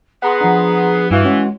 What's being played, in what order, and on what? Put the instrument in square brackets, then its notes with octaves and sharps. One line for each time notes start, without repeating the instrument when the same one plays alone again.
[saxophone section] B3 [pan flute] G#4 [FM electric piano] F#5 A#5 C6
[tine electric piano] F3 D4
[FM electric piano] G2 E4 F5 [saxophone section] E3 [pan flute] F#4
[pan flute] G#3 [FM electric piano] C#4 [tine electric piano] F#4